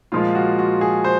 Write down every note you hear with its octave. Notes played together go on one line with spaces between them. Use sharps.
A#2 F3 G#3 F4
F#4
F#4
G#4
C5